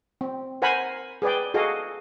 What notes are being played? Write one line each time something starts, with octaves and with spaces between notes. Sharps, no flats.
C4
A#4 C5 F#5 G#5 A#5 B5
G#4 B4 D5 G5
F#4 G#4 A4 D#5 F5